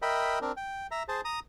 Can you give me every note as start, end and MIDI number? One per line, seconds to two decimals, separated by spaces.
0.02 0.39 70
0.02 0.39 75
0.02 0.39 76
0.02 0.39 79
0.02 0.39 83
0.42 0.52 60
0.42 0.52 62
0.42 0.52 70
0.57 0.87 79
0.91 1.03 76
0.91 1.03 82
1.08 1.21 68
1.08 1.21 72
1.08 1.21 81
1.25 1.40 82
1.25 1.40 87